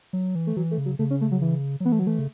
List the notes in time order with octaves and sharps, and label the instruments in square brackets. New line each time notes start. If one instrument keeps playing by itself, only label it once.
[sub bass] F#3
E3
[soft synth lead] A3
[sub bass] E3 [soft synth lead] F#3
[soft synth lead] A3
[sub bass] C#3
[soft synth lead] F#3
[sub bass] C#3 [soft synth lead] A3
[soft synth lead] C#4
A3
F#3
E3
[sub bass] F#3
[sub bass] E3 [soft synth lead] B3
[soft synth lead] A3
F#3
[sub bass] E3 [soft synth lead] A3
[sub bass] C#3